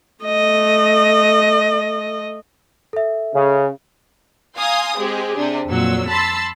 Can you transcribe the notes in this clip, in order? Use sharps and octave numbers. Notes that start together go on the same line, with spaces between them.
A3 D#5
A4 E5
C#3
F5 G#5 A#5 C6 D#6
G#3 C4 G4 G#4
C3 D4
F2 A#2 F#3 E6
A5 B5 C6 E6